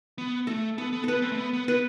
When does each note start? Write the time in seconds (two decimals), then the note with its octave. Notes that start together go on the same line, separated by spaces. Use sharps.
0.18 B3
0.47 A3 A4
0.78 B3 A4
0.93 B3
1.04 B3 A4 B4
1.22 C4
1.32 A3
1.38 B3
1.53 B3
1.68 B3 B4